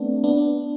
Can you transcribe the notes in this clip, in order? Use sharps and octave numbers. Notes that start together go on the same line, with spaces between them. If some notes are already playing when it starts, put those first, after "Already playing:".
Already playing: A3 B3 C4 D4
B3 D4